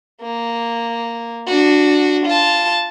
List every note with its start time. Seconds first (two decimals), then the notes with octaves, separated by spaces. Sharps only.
0.22 A#3
1.47 D4 F#4
2.26 F4 A5